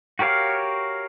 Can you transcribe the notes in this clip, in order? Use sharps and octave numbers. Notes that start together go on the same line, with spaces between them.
F#4 G4 A#4 C#5 F5